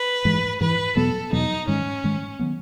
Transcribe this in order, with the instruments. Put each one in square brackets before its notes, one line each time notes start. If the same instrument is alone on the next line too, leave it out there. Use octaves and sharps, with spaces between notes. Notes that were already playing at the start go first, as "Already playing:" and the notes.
Already playing: [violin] B4
[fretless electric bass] G#2 E3 G#3
[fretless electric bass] G#2 E3 G#3 [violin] B4
[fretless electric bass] E2 B2 F#3 B3 [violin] A4
[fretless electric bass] E2 B2 F#3 B3 [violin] D#4
[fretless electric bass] G#2 D#3 G#3 [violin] C#4
[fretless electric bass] G#2 D#3 G#3
D#3 F#3 B3